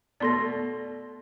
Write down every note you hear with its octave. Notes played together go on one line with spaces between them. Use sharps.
B2 A3 D5 C6 A#6